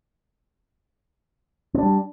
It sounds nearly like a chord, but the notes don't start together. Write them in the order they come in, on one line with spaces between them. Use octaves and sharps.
C4 D4 G3